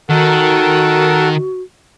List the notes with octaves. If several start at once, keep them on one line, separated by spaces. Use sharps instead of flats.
D#3 F#4 A4 A#4 F#5